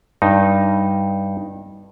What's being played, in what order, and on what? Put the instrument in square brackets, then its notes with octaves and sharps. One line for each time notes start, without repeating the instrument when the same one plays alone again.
[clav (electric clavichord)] G2 D#4